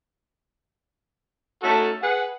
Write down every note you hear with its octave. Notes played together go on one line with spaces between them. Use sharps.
A3 C#4 D#4 F#4 A4
G#4 B4 F#5